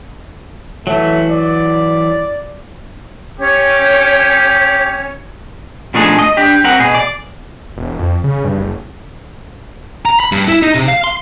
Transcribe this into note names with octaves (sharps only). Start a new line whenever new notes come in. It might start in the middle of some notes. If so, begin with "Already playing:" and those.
E3 F#3 A3
D5
C#4 G4 C#5
B2 F3 A3 D4 D#4 G#4
D#5
D4 G4
C4 A#4 F#5
B2 G#4
D5
E1
F2
C#3
G2
F#1
A#5
B5
G2
E4
D#4
C3
F5
C6